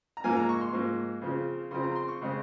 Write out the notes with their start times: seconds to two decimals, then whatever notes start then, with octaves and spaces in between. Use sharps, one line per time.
0.17 A#5
0.24 G#2 F3 A#3 G#5
0.36 A#5
0.49 C#6
0.61 C6
0.73 G#2 F3 A#3
1.22 C#3 F3 C4
1.71 C#3 F3 C4 C6
1.83 A#5
1.96 C6
2.08 C#6
2.21 C#3 G#3 C4